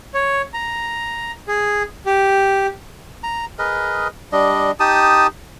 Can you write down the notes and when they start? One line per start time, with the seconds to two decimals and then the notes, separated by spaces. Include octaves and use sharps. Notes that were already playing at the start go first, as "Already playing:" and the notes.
0.14 C#5
0.54 A#5
1.48 G#4
2.06 G4
3.23 A#5
3.59 G#4 A#4 B4 D#5
4.32 G3 D4 D#5
4.80 D#4 G4 A5 D#6